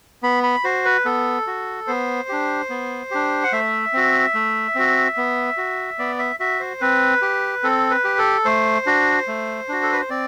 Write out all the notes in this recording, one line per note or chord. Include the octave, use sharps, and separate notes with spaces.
B3 B5
B5
F#4 C5
B4
B3 A4
F#4
B3 C5
D4 G4
B3
D4 G4
F#5
A3 E5
C4 F#4
A3
C4 F#4
B3
F#4
B3 D5
E5
F#4 E5
C5
C4 B4
G4
C4 A4
B4
G4
A4
A3 C5
D4 F#4
A3
D4 F#4
A4
B4
C5
C4 D5